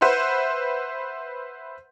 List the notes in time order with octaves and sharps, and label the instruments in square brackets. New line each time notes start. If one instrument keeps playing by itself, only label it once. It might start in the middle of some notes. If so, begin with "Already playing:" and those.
[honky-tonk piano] B4 C5 E5 F#5 C6